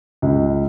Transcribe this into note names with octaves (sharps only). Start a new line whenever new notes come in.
C#2